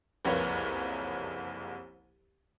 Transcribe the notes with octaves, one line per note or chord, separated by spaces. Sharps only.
F#1 C2 F2 A#3 B4 C#5